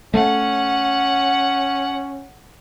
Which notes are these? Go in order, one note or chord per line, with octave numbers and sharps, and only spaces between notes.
A3 C#4 F#5